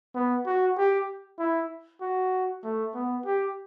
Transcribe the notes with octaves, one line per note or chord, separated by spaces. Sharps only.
B3
F#4
G4
E4
F#4
A3
B3
G4